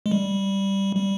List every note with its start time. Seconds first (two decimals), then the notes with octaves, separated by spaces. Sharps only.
0.06 G#3
0.11 G3
0.96 G3